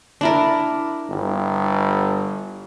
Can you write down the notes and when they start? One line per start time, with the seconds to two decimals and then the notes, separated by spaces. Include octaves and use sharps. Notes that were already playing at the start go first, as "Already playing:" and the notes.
0.21 D4 E4 A#4
1.10 G1